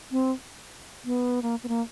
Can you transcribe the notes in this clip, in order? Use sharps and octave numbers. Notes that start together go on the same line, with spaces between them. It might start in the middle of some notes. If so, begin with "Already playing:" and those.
C4
B3
A#3
B3
A#3